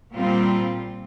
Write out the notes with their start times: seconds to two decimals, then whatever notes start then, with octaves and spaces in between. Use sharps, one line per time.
0.12 A#2 G3 C4 F4